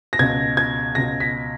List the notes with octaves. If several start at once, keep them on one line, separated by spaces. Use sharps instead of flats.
A#6
C#2 B2 G#6
G#6
C#2 B2 A#6
B6